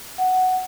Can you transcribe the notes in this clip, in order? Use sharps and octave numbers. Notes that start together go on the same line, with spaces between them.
F#5